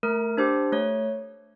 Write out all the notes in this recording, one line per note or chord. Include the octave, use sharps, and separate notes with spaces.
A3 A#4
D4 G4 C5
A3 C#5